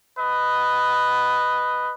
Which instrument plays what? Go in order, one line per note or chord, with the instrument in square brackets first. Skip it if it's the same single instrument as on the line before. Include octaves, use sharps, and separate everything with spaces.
[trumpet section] B4 D#5